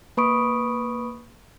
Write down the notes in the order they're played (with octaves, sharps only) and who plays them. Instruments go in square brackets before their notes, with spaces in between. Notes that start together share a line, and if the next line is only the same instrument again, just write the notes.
[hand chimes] A#3 B4 B5 C#6 D#6 D7